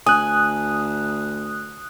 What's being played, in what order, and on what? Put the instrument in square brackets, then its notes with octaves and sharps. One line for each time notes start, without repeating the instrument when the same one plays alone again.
[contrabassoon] D2 [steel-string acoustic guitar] G#5 [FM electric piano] D#6 F#6